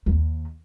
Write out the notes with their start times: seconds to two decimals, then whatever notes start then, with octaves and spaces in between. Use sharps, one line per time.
0.06 D#2